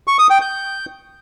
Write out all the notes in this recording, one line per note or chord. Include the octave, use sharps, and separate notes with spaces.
C#6
D#6
G5
G6